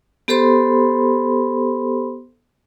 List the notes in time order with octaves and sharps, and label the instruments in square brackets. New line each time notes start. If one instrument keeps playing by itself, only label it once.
[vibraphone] B3 G4 A4 C5 B5 C6